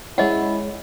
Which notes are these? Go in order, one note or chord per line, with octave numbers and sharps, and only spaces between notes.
G#3 C#4 E4 D#5 F#5